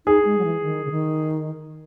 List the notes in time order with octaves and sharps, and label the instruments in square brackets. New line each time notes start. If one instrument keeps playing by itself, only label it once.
[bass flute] D#4 [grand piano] G#4
[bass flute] G#3
F#3
E3
D#3
C#3
D#3